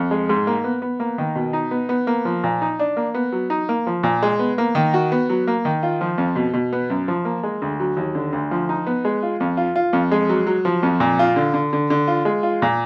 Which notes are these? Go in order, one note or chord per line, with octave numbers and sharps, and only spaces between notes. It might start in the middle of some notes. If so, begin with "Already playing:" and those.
Already playing: F2
G#3
G#2
A#3
B3
B3
A#3
D#3
B2
D#4
B3
B3
A#3
F3
A#2
D#4
D4
A#3
B3
F#3
D#4
A#3
F3
A#2
G#3
B3
A#3
D#3
F#4
B3
F#3
A#3
D#3
F4
F3
F2
B2
B2
B3
F#2
F3
A#3
G#3
D2
F#3
D#2
D3
D2
F3
D#4
B3
G#3
F4
F2
F4
F4
F2
G#3
F#3
F#3
F3
F2
A#2
F4
D3
D3
D3
D3
F4
G#3
F4
A#2